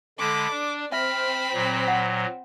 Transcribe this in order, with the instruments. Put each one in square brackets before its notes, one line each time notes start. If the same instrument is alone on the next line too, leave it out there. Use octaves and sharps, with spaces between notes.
[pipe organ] D3 G#3 [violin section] A4 A5 B5 [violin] D6
[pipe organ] D4 [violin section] D5
[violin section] C4 C5 [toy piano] E5 [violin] B5 [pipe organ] F6
[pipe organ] A#2 F#3
[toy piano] F#5